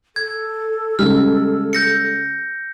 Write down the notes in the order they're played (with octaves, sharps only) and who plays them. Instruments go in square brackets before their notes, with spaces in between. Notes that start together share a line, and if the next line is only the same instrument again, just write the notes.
[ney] A4 [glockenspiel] G#6
[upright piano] C#3 G3 G#3 [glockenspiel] F6
[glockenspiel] G6 A#6 C#7